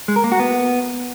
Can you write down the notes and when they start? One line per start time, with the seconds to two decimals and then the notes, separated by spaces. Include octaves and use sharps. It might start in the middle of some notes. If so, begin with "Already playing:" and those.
0.08 G#3
0.16 A#4
0.24 A#3
0.32 F#4
0.40 B3